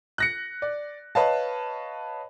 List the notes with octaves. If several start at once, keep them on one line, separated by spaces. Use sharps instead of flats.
F#6 A#6 C#7
D5
B4 C#5 D#5 F5 A5